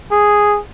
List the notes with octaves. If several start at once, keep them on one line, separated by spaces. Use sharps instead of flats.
G#4